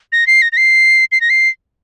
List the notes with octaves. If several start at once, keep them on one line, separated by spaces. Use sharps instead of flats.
A#6
C7
A#6
A#6
C7
C7
A#6
C7